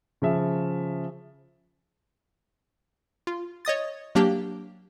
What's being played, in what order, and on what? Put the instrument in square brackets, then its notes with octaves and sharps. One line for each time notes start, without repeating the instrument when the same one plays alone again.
[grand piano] C#3 F3 E5
[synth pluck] F4
C#5 D#5 D#6 A6
F#3 A#3 D4 G4